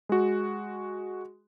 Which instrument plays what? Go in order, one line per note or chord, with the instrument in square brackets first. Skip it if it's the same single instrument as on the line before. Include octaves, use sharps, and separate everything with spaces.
[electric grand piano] G#3 F#4